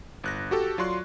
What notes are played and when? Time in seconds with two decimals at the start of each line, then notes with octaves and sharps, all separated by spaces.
0.24 G1 F#6 A#6
0.51 F#4 G4 A4
0.78 F#3 F4 D5 C6 C#6 F#6